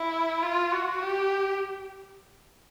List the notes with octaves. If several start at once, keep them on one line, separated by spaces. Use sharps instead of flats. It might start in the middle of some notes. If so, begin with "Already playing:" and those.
Already playing: E4
F4
F#4
G4